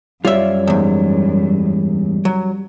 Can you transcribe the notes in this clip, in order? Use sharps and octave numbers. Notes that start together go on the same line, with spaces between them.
F#2 G3 F4 C#5 D5 E5
E2 G#2
F#3